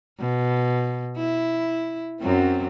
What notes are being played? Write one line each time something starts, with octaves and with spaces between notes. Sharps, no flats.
B2
E4
F#2 F#3 C4